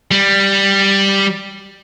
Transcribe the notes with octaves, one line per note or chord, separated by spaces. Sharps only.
G3